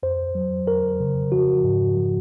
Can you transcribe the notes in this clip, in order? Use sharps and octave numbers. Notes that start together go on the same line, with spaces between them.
F2 C5
F#3
F2 A#4
C#3
F3 F#4
G#2
F3